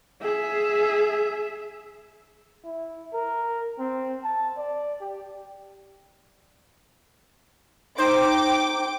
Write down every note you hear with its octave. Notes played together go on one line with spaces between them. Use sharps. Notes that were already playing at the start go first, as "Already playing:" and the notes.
G#4 E5
E4
A#4
C4
A5
D5
G4
D#4 C5 G5 D6